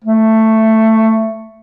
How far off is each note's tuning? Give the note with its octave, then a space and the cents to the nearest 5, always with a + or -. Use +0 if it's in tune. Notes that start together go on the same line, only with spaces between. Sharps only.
A3 +10